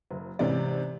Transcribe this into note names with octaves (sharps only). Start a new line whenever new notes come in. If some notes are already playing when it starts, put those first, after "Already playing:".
F#1
G#2 C3 E3 C#4 D5